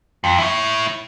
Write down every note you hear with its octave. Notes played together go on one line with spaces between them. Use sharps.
F2
E4 C#5